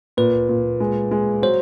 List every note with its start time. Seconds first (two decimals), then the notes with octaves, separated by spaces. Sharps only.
0.17 A#2 B4
0.49 A#2
0.80 G#3
1.11 G#3
1.42 F#3 C5